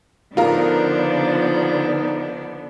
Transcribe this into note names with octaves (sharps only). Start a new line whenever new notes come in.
D3 F3 B3 D4 D#4 F4 A#4